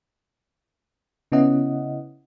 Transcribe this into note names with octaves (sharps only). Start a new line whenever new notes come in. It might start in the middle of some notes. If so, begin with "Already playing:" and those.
C#3 B3 C#4 E4 D#5 F#5